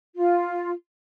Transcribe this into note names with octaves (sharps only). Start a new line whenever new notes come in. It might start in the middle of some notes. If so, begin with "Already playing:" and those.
F4